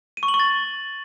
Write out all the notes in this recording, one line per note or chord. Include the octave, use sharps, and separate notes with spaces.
D#7
C#6
F#7
C#6
A6